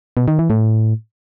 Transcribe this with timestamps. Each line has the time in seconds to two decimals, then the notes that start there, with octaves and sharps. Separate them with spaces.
0.17 B2
0.28 D#3
0.39 E3
0.50 A2